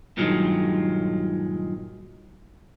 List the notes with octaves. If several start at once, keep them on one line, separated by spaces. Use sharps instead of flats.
G2 A#2 D#3 F#3 G#3